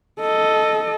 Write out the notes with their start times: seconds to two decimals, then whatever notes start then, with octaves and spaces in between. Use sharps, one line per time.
0.20 A4 D#5